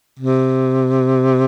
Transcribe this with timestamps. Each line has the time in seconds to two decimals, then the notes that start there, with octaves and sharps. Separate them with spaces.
0.19 C3